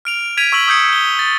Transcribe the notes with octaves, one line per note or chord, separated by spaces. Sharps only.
F6 D7 F7
G#6 B6 D7 D#7 F7
C#6 E6 B6 F#7
D#6 E6 G6 G#6 C#7
G6 G7
A6